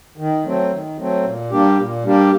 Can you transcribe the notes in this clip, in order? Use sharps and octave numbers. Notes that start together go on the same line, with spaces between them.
D#3
F#3 A3 C4
D#3
F#3 A3 C4
A#2
G3 A#3 D4 G4
A#2
G3 A#3 D4 G4